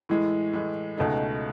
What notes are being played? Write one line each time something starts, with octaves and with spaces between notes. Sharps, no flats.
A2 E3 G#3
A2 E3 G#3
C#2 B2 A3 D#4